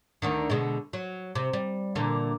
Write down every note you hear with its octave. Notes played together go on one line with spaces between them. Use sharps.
D2 D3 D#3
B2 D3 G#3
F#3
C3
G3
A#2 D3 E3